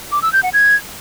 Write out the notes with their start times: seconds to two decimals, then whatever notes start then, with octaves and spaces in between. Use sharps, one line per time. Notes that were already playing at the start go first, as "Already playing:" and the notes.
0.12 D6
0.22 E6
0.33 G6
0.43 F#5
0.54 G#6